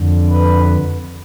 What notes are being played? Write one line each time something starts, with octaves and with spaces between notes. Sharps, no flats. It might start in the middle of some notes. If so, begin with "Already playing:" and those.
Already playing: F2 D3
B4